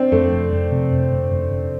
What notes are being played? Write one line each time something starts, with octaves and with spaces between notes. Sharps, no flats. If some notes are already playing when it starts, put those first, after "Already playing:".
Already playing: C4 D4
F2 A3
F1
F2
C3
F1
F1
F1
F1